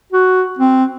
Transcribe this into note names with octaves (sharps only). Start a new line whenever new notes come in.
F#4
C4